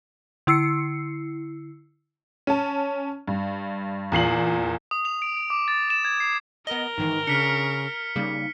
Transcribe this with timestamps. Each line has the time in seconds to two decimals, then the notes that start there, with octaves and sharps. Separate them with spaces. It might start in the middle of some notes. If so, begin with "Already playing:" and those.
0.47 D3 E4 E6 C7 C#7
2.47 C#4 A5
3.28 G2
4.12 E2 A#2 C7 F#7
4.91 D#6
5.05 F7
5.22 D7
5.37 D7
5.50 D6
5.68 A6
5.90 E7
6.05 G#6
6.20 C7
6.67 B3 A#4 D#5 G7
6.98 G#2 D#3 E3 D#4
7.27 C#3 D4 F6 B6 C#7
8.16 C#3 G3 A#3 D#4